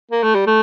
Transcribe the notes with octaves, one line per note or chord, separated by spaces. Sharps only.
A#3
A3
G3
A3